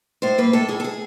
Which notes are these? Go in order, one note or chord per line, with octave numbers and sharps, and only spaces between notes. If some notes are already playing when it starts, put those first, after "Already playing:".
A2 C5
A#3 B4
A2 A4
A2 G#4
A4
G#4